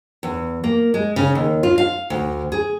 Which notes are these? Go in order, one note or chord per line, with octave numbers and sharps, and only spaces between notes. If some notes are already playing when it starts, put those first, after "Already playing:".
E2
A#3
G#3
C#3
D#2
F4
F5
D2
G#4